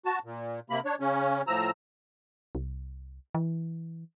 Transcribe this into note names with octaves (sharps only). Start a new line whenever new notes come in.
F#4 A5
A#2
C3 A#3 B5
D4 C#5
C#3 C#4
A2 F3 A#5 E6
C2
E3